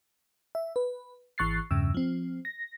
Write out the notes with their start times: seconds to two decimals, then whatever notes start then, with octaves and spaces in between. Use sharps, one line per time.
0.55 E5
0.76 B4
1.38 G#1 E3 C#6 F#6 A6 C7
1.71 E2 G2 C#3 E6
1.94 F3 C4
2.45 A#6